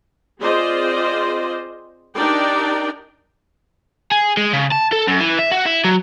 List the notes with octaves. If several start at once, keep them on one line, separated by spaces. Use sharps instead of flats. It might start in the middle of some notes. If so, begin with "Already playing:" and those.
C4 F4 G#4 C5 D5 D#5
D4 D#4 G4 A#4 D5 G5
G#4
G#3
C#3
A5
A4
F#2
E3
E5
F#4
E4
F#3